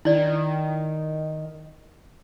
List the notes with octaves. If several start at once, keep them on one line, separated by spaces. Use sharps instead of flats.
D#3 E4 D5